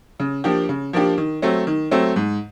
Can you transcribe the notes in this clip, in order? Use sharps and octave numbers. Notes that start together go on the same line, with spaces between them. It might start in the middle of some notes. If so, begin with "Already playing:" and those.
C#3
F3 A#3 D4 G4
C#3
F3 A#3 D4 G4
D#3
F#3 A3 C4
D#3
F#3 A3 C4
G#2